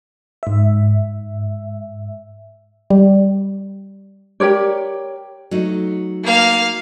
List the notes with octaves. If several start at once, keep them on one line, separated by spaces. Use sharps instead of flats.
G#2 E5
G3
G4 A#4 C#5 D5
F#3 A3 D#4
A#3 F5